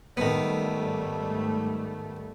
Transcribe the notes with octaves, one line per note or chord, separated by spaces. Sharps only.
G#2 D#3 G3 A3 B3